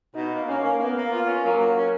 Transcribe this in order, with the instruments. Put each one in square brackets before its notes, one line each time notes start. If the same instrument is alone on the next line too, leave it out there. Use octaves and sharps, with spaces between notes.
[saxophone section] B2 [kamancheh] D#4
[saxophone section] A#3
[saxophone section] A#3 [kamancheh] C#4
[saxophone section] A#3
[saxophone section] A#3 [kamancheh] B3
[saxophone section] A#3
F4
C#4
[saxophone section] F#3 [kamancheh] A#3
[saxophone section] F#3
C#4